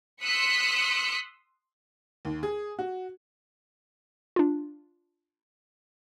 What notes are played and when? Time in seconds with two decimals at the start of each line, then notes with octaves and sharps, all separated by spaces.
0.22 C6 D#6 E6 F#6 B6 C#7
2.25 D#2
2.43 G#4
2.79 F#4
4.36 D4 F4